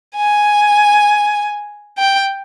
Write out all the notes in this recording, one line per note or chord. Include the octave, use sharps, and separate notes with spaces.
G#5
G5